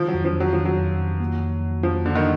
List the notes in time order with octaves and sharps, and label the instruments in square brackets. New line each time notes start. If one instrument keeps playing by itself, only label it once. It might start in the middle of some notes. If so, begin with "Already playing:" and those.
Already playing: [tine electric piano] D#3 [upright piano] F3
[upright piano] F#3
[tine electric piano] F2
[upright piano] F3
[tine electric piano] F2
[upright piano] F#3
[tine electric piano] D#3 [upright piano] F3
[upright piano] F#3
[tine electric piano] F2
F2
A#3
F2
F2
[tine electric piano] F2 [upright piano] F3
[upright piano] D3 [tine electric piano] A#3
[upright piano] D#3